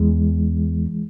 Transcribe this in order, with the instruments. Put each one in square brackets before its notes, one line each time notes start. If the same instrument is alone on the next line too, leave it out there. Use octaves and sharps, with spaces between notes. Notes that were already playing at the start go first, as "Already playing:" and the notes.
Already playing: [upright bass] E2 [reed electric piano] E3 G#3